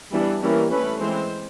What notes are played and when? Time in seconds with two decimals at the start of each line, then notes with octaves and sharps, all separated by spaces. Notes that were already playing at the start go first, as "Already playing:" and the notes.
0.13 E3 G3 B3 D4
0.42 E3 G3 A#3 C#4 A#4
0.71 E3 A3 C#4 B4
1.00 E3 G#3 C4 C5